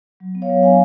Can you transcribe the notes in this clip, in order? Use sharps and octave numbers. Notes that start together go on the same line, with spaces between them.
F#3
B3
C#5 F5
F#3
D4 F5 G#5